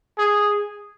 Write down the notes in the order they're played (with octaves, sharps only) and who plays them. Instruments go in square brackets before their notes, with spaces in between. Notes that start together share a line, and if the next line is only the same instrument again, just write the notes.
[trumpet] G#4